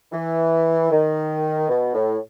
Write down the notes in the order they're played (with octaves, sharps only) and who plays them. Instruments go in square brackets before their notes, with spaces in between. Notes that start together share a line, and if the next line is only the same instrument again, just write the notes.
[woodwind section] E3
D#3
B2
A2